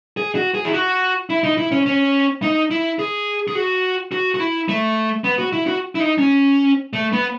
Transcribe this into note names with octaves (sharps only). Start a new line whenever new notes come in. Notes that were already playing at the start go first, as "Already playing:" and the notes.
G#4
F#4
G#4
E4
F#4
E4
D#4
E4
C#4
C#4
D#4
E4
G#4
G#4
F#4
F#4
F#4
E4
A3
B3
F#4
E4
F#4
E4
D#4
C#4
A3
B3